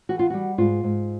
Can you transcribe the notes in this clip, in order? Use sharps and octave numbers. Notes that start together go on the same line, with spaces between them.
E3 F#4
F4
G3 F#4
G#2 F4
G#2